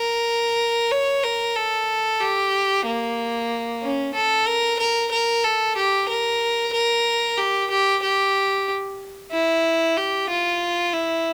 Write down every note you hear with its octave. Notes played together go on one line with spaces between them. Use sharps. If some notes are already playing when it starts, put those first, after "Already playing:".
Already playing: A#4
C#5
A#4
A4
G4
A#3
C#4
A4
A#4
A#4
A#4
A4
G4
A#4
A#4
G4
G4
G4
E4
G4
F4
E4